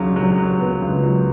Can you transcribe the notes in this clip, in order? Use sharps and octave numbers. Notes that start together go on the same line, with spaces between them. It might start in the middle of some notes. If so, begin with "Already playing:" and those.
Already playing: C#2 C#3 F#3
F#3
F#3
B3
C#2
F#3